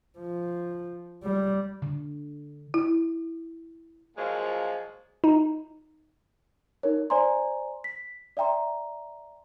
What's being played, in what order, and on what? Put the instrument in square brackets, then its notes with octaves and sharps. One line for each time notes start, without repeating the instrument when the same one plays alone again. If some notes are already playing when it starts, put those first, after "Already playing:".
[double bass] F3
G3
[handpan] D3
[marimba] E4
[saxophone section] A#2 F3 F#3 G#3 A#3
[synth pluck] D#4
[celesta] D#4 A#4 C#5
C5 D5 G#5 A#5 C6
B6
D5 E5 G5 A#5 C6